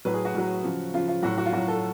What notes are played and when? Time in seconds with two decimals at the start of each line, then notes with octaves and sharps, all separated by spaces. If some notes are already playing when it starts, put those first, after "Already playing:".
0.05 A2 F#3 B4
0.14 G#4
0.25 F#4
0.34 A2 F#3
0.63 C#3 F3
0.94 C#3 F3 F4
1.08 F4
1.22 A2 F#3 F#4
1.38 F#4
1.46 F4
1.52 A2 F#3 F#4
1.68 A4